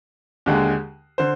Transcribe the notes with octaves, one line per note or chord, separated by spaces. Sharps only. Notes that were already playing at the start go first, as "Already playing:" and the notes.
D#2 D3 G#3
D3 C5